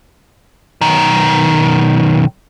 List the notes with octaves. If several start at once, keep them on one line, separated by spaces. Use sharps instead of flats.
B1 D#3